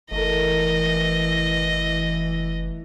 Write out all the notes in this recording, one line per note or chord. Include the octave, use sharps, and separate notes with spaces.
F#1 E3 A3 A4 A#4 D#5